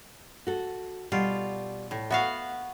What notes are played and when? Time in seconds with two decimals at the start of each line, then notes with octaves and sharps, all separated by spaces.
0.47 F#4 A4
1.12 B2 G3 F4
1.91 A2
2.11 B3 F#4 E5 F5